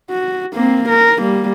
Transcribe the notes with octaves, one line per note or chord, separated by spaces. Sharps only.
F#4
A#3 C4
A#4
G3 A#3